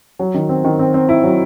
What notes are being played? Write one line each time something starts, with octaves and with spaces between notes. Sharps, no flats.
F#3
D#3
C4
D#3
C4
C4
E4
F#3